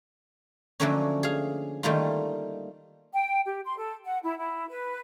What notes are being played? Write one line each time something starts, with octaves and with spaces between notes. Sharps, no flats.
D3 F3 F#3 A3 A#3 C#4
G#4 F5
D#3 G3 A3 A#3 D#4 F4
G5
G4
C6
A4
F#5
E4
E4
B4